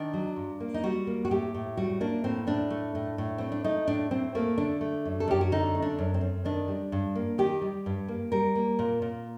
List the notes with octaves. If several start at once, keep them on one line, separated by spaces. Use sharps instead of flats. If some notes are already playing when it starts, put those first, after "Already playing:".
Already playing: D#3 D4
F#3
G2
A#3
D#4
G3 F#4
A#3
F#4
A2 G4
A2
G3 F#4
A#3 D4
A2 C4
A2 D4
A3
A2
A2
A3 C4
D4
A3 D#4
A2 D4
A2 C4
A3 A#3
D3 D4
A3
F#2
A4
F#2 G4
F#4
D3 D#4
A3
D4
F#2
C4
F#2
D#3 D4
G3
G2
A#3
D#3 G4
G3
G2
A#3
G3 A#4
A#3
A#2
A#2